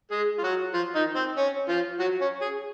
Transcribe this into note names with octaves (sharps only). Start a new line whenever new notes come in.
G#3 G#4
F4
F#3 F#4
F3 F4
D#3 D#4
C4
C#4
F3 F4
F#3 F#4
C#4 C#5
G#4 G#5